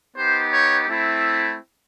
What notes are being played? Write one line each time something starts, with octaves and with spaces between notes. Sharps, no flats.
B3 D#4 G4 C5
C#5
A3 C4 E4